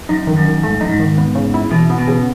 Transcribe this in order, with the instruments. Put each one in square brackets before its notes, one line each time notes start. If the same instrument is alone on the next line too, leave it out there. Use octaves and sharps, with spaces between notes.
[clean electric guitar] F#2 [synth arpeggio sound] D#4
[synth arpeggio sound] D#3
[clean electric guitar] F#2
[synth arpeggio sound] D#3
[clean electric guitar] G#2 [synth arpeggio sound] A3
[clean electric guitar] F#2 [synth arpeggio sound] D#4
[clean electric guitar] G#2
[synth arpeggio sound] D#3
B3
C#3
E4
[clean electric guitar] B2 [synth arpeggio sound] E3
[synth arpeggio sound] B3
[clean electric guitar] B2
[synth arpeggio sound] C#3